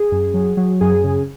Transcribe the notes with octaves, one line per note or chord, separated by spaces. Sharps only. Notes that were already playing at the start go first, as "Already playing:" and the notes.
Already playing: G#4
F#2
F#3
F#3
F#2 G#4
C#3